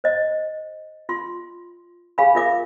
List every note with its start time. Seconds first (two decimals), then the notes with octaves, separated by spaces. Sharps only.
0.04 C5 D#5
1.09 F4 C6
2.18 G4 G#4 F5 G#5 B5
2.35 F4 A#4 E5 D6